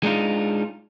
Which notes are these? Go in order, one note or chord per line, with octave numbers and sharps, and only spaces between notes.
G#3 D4 D#4 F4